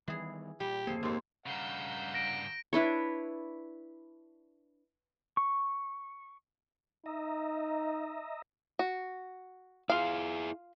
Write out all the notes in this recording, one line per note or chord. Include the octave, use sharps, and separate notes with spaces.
D#3 E3 G3 B3 G#4
A#2 G3 G4
D1 F2 C#3 A#3 G#4 A4 C5
D#2 G#2 C4
G2 C#3 F5 F#5 A#5 E6 G6
A#6 D7
D4 E4 B4 C#5
C#6
D#4 D#5 E5 A#5
F#4
E4 F4 G#4 F5